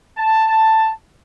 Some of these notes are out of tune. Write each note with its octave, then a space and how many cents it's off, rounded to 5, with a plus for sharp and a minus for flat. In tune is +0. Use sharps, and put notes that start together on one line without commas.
A5 +10